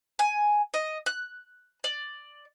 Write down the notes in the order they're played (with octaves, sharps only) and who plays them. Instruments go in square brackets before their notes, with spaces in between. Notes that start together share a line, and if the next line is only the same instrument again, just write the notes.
[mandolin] G#5
D#5
F#6
D5